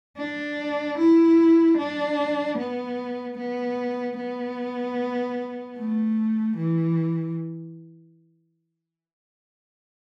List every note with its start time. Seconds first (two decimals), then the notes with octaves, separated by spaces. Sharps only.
0.18 D4
0.98 E4
1.78 D4
2.58 B3
3.38 B3
4.18 B3
5.77 A3
6.57 E3